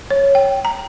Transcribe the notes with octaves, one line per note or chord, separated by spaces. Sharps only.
C#5
G5
A#5